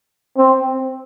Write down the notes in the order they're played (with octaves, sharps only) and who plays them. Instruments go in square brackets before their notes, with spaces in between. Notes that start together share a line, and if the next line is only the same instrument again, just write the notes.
[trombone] C4